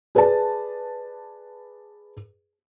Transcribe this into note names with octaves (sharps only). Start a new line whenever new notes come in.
G#4 B4 D5 A5